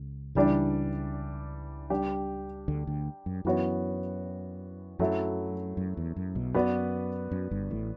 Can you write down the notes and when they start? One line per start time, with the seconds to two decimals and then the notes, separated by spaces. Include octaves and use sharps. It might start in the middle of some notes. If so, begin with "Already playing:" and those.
Already playing: C#2 C#3
0.35 C#2 C#3 E3 G3 D4
1.90 G3 D4 G4
2.68 D2 D3
2.87 D2 D3
3.26 F#2
3.45 F#2 E3 B3 F#4 C#5
4.99 F#2 F#3 A3 E4
5.77 F#2
5.97 E2
6.16 F#2
6.35 B1 B2
6.54 F#2 B3 F#4 B4 D5
7.32 F#2
7.51 G1 G2
7.70 A1 A2